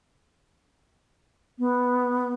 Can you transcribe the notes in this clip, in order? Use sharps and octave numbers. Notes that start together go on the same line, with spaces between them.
B3